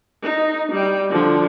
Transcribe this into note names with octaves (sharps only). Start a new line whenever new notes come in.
D#4
G3 G5
D3 F3